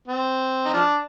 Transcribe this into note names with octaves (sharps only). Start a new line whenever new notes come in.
C4
D#4
F3 D4